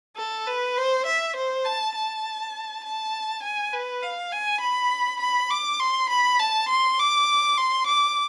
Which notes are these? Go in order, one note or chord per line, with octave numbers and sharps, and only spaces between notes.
A4
B4
C5
E5
C5
A5
A5
A5
G#5
B4
F5
G#5
B5
B5
D6
C6
B5
A5
C6
D6
C6
D6